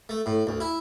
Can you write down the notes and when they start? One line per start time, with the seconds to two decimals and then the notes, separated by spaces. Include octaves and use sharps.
0.09 A3
0.26 A2
0.47 D2
0.60 E4